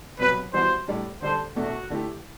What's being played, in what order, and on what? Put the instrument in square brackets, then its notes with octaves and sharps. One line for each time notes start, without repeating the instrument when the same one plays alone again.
[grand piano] C2 B2 F#3 [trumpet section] B4
[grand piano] E3 G3 B3 F#4 [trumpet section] C5
[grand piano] A2 G3 D4
[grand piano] D3 G3 D4 A4 [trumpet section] C5
[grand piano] E2 B2 A3 D4 A4 [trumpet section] F#4
[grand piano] D3 A3 E4 G4